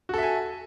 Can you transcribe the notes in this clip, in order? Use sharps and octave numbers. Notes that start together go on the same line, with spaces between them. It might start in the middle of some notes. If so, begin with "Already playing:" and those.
F#4 A4 E5 G#5